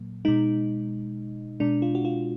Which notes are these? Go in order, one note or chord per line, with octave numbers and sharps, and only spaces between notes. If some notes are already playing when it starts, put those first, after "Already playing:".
Already playing: A#2 F#3 A#3
B2 G#3 D#4
B2 G#3 D4
F4
F#4
F4